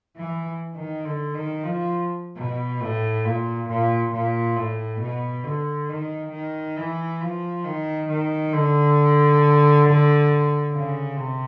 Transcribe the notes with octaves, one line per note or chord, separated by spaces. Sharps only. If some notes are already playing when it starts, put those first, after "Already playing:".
E3
D#3
D3
D#3
F3
B2
A2
A#2
A#2
A#2
A2
B2
D3
D#3
D#3
E3
F3
D#3
D#3
D3
C#3
C3